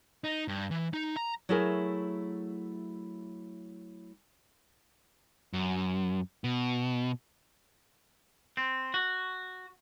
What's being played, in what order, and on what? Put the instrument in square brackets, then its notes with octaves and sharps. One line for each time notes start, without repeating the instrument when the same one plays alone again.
[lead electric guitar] D#4
G2
E3
D#4
A#5
[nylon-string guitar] F#3 A3 E4 G#4 A#4 G#5
[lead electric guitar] F#2
B2
[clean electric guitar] C4
F#4